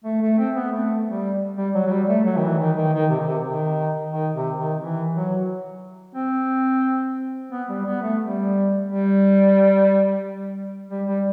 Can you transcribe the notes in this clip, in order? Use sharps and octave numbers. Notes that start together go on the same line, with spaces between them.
A3
A3
C4
B3
A3
G3
G3
F#3
F#3
G3
A3
F#3
D#3
E3
D#3
D#3
D#3
C3
D#3
C3
D#3
D#3
C3
D#3
E3
F#3
C4
B3
G3
B3
A3
G3
G3
G3
G3